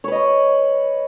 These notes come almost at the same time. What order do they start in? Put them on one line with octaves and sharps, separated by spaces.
C#5 B4 D#5 B5